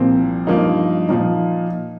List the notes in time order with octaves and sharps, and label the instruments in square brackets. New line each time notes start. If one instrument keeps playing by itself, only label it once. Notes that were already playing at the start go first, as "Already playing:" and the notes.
Already playing: [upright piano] C2 A#2 F3 C4
G2 F3 A#3 D#4
A#2 F3 D#4